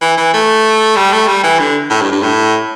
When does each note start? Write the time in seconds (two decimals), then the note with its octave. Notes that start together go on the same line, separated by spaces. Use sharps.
0.01 E3
0.17 E3
0.34 A3
0.96 G3
1.13 A3
1.27 G3
1.44 E3
1.59 D3
1.90 A2
2.02 G2
2.12 G2
2.23 A2